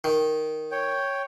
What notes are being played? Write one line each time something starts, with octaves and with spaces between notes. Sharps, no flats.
D#3
C#5 G5